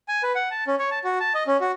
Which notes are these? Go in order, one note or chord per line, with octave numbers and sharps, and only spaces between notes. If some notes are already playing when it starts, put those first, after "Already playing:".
G#5
B4
F#5
A5
C#4
C#5
A5
F#4
A5
D#5
C#4
F#4